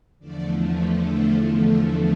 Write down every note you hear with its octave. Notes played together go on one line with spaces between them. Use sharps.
E2 D3 F3 A3 D5
C5